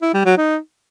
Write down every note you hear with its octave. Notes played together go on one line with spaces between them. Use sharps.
E4
G3
F#3
D#4